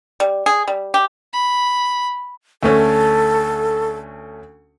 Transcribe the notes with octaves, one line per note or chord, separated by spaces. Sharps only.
G3
G#4
G3
G4
B5
D2 A3 C#4 A4